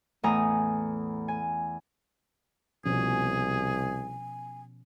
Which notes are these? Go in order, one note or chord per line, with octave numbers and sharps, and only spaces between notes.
E2 A2 G#5 A#5 D#6
G#5
C2 B2 F3 C#4 G#4 G#5